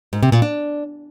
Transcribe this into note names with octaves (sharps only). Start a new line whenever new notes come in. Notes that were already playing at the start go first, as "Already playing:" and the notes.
G#2
C3
A#2
D4